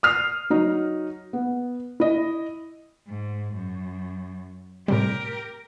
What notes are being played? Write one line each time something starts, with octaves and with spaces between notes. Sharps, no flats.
D#6 F6 C7
F#3 D#4
B3
E4 D#5
G#2
F#2
A2 C3 G3 G4 A#4